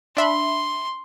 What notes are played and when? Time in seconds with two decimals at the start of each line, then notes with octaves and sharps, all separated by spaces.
0.17 D4 E5 B5 C6